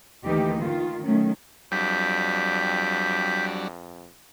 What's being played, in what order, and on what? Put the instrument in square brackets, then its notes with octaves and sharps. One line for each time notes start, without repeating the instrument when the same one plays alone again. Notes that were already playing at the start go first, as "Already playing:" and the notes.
[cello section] D2 D#3 E3 A#3 D#4 G4
D#3 F4
D#3 F#3 A3 C#4
[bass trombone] F2 [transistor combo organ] F#3 G3 D4 [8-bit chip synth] G6 B6